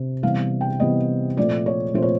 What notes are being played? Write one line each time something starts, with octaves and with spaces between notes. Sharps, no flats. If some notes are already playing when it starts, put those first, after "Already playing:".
Already playing: C3
C3 E3 G3 B3 F5
G5
C3 E3 G3 B3 D#5
A#2 F3 A3 C4 D5
C#5
A#2 F3 A3 C4 C5
C#5